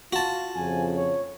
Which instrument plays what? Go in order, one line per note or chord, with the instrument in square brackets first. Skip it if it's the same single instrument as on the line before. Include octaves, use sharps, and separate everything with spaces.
[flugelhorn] F4 [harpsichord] F#4 A5
[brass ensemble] F2 C#3 [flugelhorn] G#5
[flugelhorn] C#5